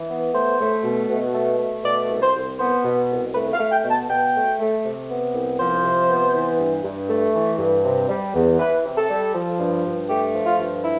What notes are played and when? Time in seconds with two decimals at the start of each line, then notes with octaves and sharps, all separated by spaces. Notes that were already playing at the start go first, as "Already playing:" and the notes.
Already playing: E3
0.09 B3
0.33 A3 C5
0.59 A3
0.83 B2
1.08 B2
1.33 A3
1.59 A3
1.84 B2 D5
2.09 C2
2.21 C5
2.34 C2
2.59 B3 C5
2.83 B2
3.09 C2
3.33 A3 B4
3.53 F5
3.58 A3
3.71 G5
3.84 B2
3.89 A5
4.08 B2 G5
4.34 A3
4.59 A3
4.84 C3
5.09 B3
5.34 C2
5.59 F3 C5
5.83 C3
6.09 B3
6.33 E3
6.59 G2
6.84 G2
7.09 A3
7.34 E3
7.58 G2
7.84 C3
8.08 G3
8.34 E2
8.58 E3 B4
8.84 C3
8.96 A4
9.09 G3
9.34 F3
9.58 G2
9.84 G2
10.09 A3 G4
10.34 F3
10.46 F4
10.58 G2
10.83 E4